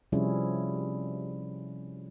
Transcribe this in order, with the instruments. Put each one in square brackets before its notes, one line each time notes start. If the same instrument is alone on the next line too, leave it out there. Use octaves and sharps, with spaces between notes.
[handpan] C3 F3 G3 C#4 E4 G#4